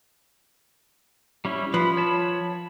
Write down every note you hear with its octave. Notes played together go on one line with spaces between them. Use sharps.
G3 C#4 E4
F3 B4 B5
C#5 A5 B5